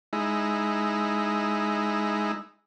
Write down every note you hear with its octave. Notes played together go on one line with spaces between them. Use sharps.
G#3 D#4 E4